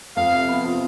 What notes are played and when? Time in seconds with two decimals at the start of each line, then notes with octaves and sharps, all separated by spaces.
0.16 F2 F5
0.33 C3
0.48 B3
0.64 F3